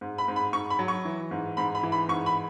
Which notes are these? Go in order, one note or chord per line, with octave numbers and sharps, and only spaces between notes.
G#2
B5
G#2
B5
G#2 C#6
B5
F#3
C#6
E3
G#2
G#2 B5
B5
E3
B5
G#2 C#6
B5